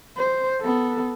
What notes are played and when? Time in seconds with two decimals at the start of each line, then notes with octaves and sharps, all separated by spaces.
0.17 C5
0.62 B3 A4